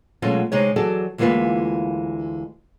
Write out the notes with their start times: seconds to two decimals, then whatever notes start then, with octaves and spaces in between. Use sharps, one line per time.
0.22 B2 F#3 G#3 A3 C#4 F4
0.52 C3 G#3 D#4 C#5
0.76 E3 F#3 F#4 G#4 A4 D5
1.18 D2 E3 G#3 A#3 F4 B4